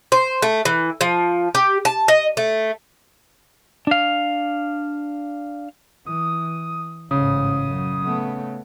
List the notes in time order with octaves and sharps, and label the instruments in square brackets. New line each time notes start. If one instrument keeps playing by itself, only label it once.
[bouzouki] C5
A3
E3
F3
G4
A5
D#5
A3
[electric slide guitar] D4 F5
[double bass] E3 [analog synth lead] D#6
[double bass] A1 G#2 [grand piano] C#3 [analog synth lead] D#6
[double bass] F#2
A3 B3